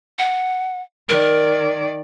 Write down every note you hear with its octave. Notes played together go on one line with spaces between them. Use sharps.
F#5
D#3 A#4 D5